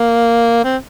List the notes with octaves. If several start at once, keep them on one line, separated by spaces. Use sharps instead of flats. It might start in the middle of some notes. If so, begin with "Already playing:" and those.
Already playing: A#3
C4